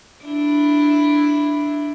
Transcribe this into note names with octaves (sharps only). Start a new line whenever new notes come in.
D4 E4